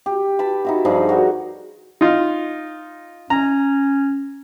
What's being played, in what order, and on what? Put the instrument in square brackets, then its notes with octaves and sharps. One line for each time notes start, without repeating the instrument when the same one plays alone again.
[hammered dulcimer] G4
B4 A5 B5
D#4 E4 F#4
G2 F3 D#4 G#4
F#4 A#4
[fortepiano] D#4 F4
[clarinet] C#4 [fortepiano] A#5